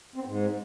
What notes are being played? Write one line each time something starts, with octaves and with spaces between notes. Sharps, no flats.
C4
B3
G#2